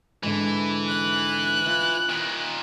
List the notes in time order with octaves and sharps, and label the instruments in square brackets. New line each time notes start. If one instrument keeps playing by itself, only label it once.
[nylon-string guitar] G#2 D3 [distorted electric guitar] E3
[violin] F#6
[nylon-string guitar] E4 F4
[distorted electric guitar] A#2 D#3